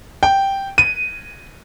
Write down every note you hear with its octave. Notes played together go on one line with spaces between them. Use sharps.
G5
D#7